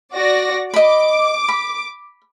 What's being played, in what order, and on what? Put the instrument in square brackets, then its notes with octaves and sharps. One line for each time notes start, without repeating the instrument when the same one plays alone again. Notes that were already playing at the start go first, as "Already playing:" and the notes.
[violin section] F#4 D5 A#6
[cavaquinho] D#5 B5 [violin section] D6
[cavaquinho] B5